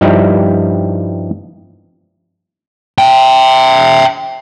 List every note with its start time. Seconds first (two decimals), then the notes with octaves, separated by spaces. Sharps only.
0.01 G2 F3 G3 D#4 E4
2.98 E5 G5